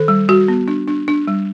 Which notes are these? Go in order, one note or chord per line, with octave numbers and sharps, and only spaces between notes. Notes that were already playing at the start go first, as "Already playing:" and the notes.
Already playing: D#3 A4
G3
G3 F#4
B3
D4
D4
D4
G3